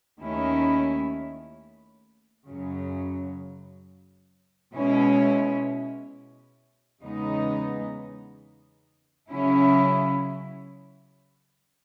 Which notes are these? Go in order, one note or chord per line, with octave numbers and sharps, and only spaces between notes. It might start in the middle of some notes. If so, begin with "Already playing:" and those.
D#2 D#3 A3 C#4 E4
F#2 C#3 F#3
B2 G#3 C#4 E4
E2 C#3 G#3 B3 D#4
C#3 F#3 C#4 E4